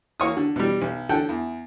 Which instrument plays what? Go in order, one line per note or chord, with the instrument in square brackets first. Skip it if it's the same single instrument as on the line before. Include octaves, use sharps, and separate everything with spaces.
[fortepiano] E3 A#3 C#5 D#6
D3
B2 G3
B1
D3 A4 F#5 G5
E2